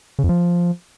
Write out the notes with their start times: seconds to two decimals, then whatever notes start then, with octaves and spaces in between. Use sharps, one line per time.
0.19 C#3
0.24 F2
0.29 F3